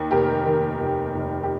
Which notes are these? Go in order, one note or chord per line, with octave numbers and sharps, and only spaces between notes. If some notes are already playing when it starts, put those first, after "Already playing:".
Already playing: D#2
F1 G4 A#4
D#3
F1
F1
G4